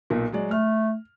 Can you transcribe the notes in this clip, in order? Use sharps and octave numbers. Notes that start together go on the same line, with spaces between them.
B1 A#2
F#3 G#3 D5
A3 F6